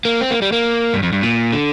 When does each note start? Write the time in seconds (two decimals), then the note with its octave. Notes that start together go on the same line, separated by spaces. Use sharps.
0.05 A#3
0.21 C4
0.31 A#3
0.42 G3
0.52 A#3
0.94 G2
1.03 F2
1.13 G2
1.23 A#2
1.52 D3